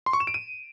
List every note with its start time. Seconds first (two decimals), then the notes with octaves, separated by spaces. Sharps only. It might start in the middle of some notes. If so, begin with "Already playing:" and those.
0.06 C6
0.13 C#6
0.20 E7
0.27 D7
0.34 D#7